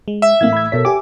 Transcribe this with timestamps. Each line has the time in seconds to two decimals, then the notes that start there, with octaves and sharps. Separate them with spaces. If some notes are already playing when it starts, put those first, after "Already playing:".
0.08 G#3
0.22 E5
0.41 A2 E3 A#3 F5 G#6
0.53 B5 G#6
0.72 B2 A4 A#4 C#5 B6
0.85 G4 G#5 D6